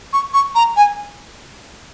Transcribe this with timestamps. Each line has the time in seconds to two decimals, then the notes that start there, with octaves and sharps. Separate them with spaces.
0.13 C#6
0.33 C#6
0.55 A#5
0.76 G#5